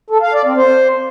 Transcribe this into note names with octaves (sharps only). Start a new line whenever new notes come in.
A4
F5
D5
C4
C5